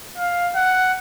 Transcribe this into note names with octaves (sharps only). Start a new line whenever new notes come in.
F5
F#5